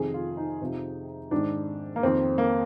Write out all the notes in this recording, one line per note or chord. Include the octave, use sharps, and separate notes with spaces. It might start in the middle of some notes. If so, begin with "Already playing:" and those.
Already playing: F2 C3 D#3 G#4
F4
D#4
F2 C3 F3
G#2 D#3 D4
A#3
F2 D#3 C4
A#3